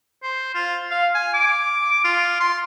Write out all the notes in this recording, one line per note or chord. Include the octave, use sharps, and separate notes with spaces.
C5
F4
F5
G#5
D6
F4
C6